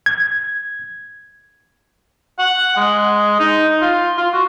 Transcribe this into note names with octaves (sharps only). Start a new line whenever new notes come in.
G#6
F#5
G#3
D#4
F4
F4
F#4